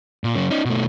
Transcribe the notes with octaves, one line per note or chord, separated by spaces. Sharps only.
A#2
F#2 C#3
C#4 D#4
B2 A3